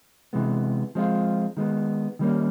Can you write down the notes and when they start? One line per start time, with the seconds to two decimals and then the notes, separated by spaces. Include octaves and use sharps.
0.33 C3 E3 G#3 B3
0.95 F3 G#3 C4 F4
1.57 D#3 G#3 B3
2.19 D#3 G3 A#3 C#4